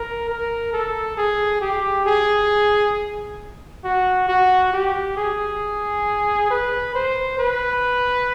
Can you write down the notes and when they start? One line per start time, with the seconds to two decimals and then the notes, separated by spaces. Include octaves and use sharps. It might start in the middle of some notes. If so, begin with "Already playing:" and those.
Already playing: A#4
0.29 A#4
0.73 A4
1.17 G#4
1.61 G4
2.06 G#4
3.84 F#4
4.28 F#4
4.73 G4
5.17 G#4
6.50 B4
6.95 C5
7.39 B4